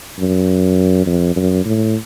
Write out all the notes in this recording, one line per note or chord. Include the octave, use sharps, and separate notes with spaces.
F#2
F2
F#2
A2